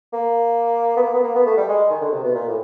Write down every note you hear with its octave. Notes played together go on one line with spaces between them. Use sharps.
A#3
B3
A#3
B3
A#3
B3
A3
G3
G#3
D#3
D3
C3
B2
A#2
A2